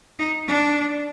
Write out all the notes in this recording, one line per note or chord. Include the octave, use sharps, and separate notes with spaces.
D#4
D4